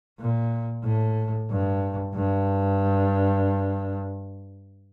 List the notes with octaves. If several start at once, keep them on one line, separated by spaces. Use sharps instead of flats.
A#2
A2
G2
G2